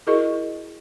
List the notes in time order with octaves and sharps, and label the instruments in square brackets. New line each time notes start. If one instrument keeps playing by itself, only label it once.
[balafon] E4 F#4 G#4 A#4 D#5 C#6